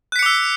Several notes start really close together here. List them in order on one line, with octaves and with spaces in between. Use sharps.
F#6 B6 C#7 D6 E6